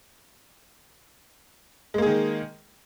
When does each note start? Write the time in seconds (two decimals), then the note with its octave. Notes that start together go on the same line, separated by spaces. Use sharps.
1.94 G#3
1.98 A#3
2.02 G#4
2.06 D#3